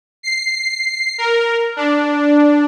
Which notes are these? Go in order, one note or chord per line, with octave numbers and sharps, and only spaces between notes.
C7
A#4
D4